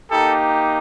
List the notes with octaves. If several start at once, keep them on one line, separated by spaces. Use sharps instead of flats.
A#3 D#4 G4 A4